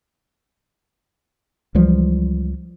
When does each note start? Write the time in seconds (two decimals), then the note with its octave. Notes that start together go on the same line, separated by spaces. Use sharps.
1.75 C#2 E3 F3 G3